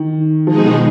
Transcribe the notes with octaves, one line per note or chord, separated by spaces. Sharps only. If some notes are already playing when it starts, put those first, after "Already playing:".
Already playing: D#3
B2 F3 G#3 D#4 G#4
F3
D#3